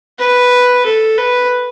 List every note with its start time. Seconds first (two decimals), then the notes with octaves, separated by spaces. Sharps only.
0.19 B4
0.86 A4
1.18 B4